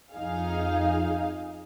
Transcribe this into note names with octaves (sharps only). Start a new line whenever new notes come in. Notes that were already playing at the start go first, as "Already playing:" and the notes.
F2 D#4 G#4 F5